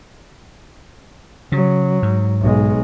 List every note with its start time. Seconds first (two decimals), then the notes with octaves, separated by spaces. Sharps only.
1.52 C#3 F#3
2.02 G#2
2.41 B1 G#3